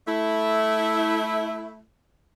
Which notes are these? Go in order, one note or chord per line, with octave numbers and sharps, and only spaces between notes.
A3 E4